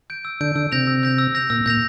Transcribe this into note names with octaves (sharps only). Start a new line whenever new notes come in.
G6 D7
E6
D3 G6 D7
D3 E6
C3 G6 A#6 F7
E6
G6 A#6 F7
E6
G6 A#6 F7
A#2 E6
A#2 G6 A#6 F7